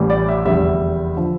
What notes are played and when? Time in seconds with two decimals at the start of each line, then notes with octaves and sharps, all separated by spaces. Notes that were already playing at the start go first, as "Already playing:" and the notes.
Already playing: A1 A2 E3 G3
0.10 D5
0.28 E5
0.45 F1 E2 D3 G3 E5
1.17 D3 F3